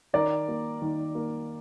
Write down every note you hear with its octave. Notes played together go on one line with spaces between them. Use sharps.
D#3 A#4 D5
A#3
D#3
A#3